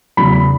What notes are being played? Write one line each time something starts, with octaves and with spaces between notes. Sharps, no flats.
E2 C#3 F#3 B5